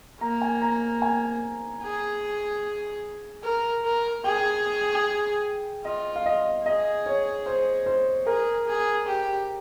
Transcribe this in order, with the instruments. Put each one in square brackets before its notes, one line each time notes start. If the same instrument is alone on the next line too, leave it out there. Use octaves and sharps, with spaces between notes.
[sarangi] A#3 [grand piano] A#5
[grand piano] G#5
A#5
G#5
[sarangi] G#4
A#4
A#4
[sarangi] G#4 [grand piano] G5
[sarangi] F4 [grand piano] D#5
[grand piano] F5
D#5
[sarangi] G#4 [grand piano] D#5
[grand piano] C#5
C5
C5
[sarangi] G#4 [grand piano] A#4
[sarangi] G#4
G4